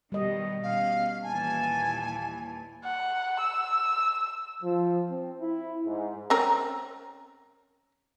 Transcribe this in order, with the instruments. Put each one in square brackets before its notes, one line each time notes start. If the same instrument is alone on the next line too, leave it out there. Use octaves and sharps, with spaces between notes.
[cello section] B2 D#3 [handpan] G3 D#5
[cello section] B2 C#4 [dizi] F5
[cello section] D#2 A#2 E3 [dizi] G#5 [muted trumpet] A5
[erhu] F#5
E6
[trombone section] F3
C4
E4
G#2
[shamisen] C4 C#4 A#4